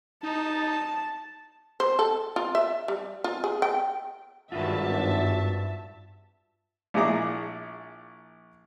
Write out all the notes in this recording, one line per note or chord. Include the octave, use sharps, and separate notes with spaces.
D#4 A5
C5
A4
F4
E5
G3
F4
G#4
G5
G#1 G2 F4 F#4 B4 E5 A5
A#1 A#2 E4 G#4 A#5 D6